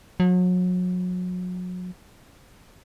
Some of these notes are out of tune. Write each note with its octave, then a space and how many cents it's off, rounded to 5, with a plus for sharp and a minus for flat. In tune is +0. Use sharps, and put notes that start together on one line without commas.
F#3 -35